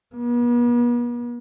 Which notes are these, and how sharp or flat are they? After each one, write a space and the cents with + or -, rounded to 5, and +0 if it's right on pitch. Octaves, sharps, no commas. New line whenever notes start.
B3 -45